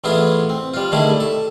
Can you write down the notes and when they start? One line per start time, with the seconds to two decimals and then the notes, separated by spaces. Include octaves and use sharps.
0.04 A1 B3 E4 F4 G#4 D#6
0.49 C4
0.74 G3 F4
0.92 D3 D#3 G3 A3 E4 G#4
1.20 A4